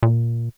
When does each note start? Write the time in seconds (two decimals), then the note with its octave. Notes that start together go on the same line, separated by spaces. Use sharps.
0.03 A#2